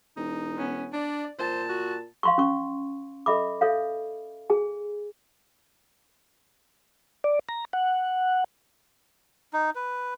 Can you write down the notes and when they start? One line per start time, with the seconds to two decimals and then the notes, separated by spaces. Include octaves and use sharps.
0.17 E1 D#4
0.57 B3 C#4
0.93 D4 D5
1.39 A#2 C5 A5
1.69 F#4
2.23 F5 C6 C#6
2.38 C#4 C#6
3.26 A4 D#5 E5 B5 D6
3.61 A4 C#5 E5 F5
4.50 G#4 G#5
7.24 D5
7.49 A#5
7.73 F#5
9.53 D#4
9.75 B4